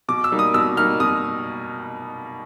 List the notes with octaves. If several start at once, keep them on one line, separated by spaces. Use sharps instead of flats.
B2 D6
E6
G3 A#3 D#4
D#6
B2 E6
G3 A#3 D#4 F6
B2 D#6